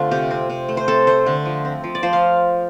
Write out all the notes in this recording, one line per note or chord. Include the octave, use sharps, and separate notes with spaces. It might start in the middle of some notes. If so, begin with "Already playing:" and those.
Already playing: D3 A3 C4 D4 F4
C3 G4
C4
C3
A3
C5
C4 A4
A3 C5
D3
F3
C4
F3
D5
F3 C5
F5